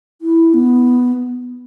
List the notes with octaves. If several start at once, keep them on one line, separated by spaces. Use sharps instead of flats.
E4
B3